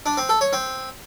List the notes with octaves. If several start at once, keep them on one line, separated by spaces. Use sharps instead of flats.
D4
C4
A4
C#5
C4